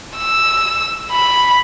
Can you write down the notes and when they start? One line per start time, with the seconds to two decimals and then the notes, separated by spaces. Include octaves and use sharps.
0.17 E6
1.12 B5